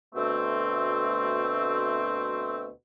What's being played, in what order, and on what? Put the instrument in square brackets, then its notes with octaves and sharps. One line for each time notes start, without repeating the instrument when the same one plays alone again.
[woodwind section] D2 B2 A3 C4